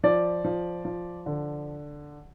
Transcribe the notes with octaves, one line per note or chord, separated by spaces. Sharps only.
F3 D5
F3
F3
D3